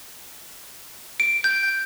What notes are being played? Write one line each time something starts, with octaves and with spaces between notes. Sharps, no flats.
D7
G6